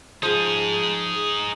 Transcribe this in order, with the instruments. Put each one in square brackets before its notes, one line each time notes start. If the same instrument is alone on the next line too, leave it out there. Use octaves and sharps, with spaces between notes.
[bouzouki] F3 G#3 [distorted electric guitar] D#4 G#4